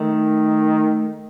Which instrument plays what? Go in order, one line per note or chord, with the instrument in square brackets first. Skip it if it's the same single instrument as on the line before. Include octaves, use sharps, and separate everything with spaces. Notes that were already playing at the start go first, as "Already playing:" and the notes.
Already playing: [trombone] D#3 [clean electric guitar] A3